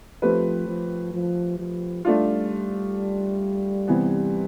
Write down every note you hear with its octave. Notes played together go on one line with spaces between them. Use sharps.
F3 A3 C4 G4 B4
F3
F3
F3
G3 A3 D4 F4
C3 E3 B3